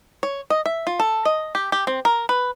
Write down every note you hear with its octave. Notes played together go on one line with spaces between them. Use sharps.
C#5
D#5
E5
F4
A4
D#5
G4
G4
C4
A#4
B4